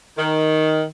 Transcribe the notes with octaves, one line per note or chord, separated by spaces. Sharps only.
D#3